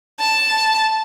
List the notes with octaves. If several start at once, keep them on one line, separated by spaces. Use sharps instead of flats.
A5